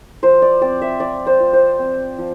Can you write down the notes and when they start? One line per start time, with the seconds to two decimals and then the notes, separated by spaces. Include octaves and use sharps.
0.23 F3 C5
0.42 D5
0.61 C4 D5
0.82 E5
1.00 F3 D5
1.26 C5
1.40 F4
1.53 C5
1.79 C4
2.18 F3